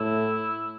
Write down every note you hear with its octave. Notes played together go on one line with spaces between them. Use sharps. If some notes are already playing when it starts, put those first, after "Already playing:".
Already playing: A2 E4